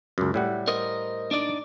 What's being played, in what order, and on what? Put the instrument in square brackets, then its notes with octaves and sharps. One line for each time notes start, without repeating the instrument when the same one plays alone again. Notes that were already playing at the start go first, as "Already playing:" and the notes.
[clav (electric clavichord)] C#2 F#2
A2 G3 F#5
[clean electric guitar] A#4 C5 D#5
D4 D#4 D5